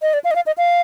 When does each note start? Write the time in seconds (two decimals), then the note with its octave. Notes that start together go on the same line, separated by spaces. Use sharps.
0.02 D#5
0.14 D5
0.24 F5
0.31 D#5
0.36 F5
0.46 D#5
0.58 F5